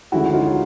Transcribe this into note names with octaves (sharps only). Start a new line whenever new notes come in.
D2 D3 F3 G#3 C#4 E4 F#4
D#4 F4